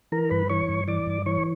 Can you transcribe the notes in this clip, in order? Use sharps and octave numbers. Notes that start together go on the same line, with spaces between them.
E3 A#4 A#5
G2 B4 B5
E3 C#5 C#6
G2
E3 D5 D6
G2
E3 C#5 C#6